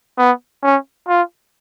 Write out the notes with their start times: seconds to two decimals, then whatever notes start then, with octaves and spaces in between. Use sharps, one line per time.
0.18 B3
0.63 C#4
1.08 F4